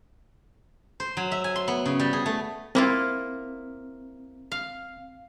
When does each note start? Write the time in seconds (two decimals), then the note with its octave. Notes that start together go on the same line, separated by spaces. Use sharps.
1.00 C5
1.17 F#3
1.31 E5
1.44 G#5
1.56 C6
1.68 B3
1.86 C#3
2.00 G3
2.13 G#4
2.26 A3
2.75 A#3 C4 E4 F4
4.52 F5